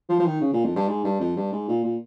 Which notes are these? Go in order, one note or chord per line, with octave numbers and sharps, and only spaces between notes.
F3
F3
D#3
C#3
A#2
F2
G2
G#2
G2
F2
G2
G#2
A#2
A#2